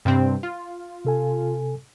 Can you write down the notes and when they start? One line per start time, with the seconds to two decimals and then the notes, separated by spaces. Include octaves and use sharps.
0.05 G2 C3 C4
0.43 F4
1.05 C3 A4 G#5